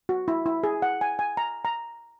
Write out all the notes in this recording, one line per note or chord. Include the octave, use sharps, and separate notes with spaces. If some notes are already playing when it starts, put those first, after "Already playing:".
F#4
E4
E4
G#4
F#5
G#5
G#5
A#5
A#5